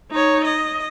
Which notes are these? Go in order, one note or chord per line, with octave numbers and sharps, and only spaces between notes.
D#4 C#5
D#5